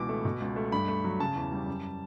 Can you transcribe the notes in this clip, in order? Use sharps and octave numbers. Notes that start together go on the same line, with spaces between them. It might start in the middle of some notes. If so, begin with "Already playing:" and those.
Already playing: C#2 B2 E3 D6
A3
B2
C#2
A3
G2 B5
A3
F#3
C#3 A5
E2
G3
F#2